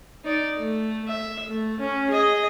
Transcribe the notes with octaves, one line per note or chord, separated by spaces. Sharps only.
D#4 D5
A3
E5
A3
C#4
G#4 D#5